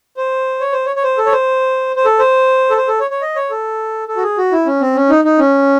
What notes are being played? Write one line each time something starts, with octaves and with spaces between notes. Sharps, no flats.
C5
C#5
C5
C#5
C#5
C5
A4
C#5
C5
C5
A4
C5
A4
C5
A4
C#5
C#5
D#5
C#5
A4
A4
F#4
G#4
F#4
E4
C#4
C4
C#4
D#4
D#4
C#4